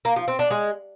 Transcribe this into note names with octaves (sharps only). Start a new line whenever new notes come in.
A#3
F3
C4
D4
G#3